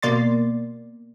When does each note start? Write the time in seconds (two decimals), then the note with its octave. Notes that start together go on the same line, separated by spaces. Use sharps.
0.02 B2 A#3 D5 C6 A6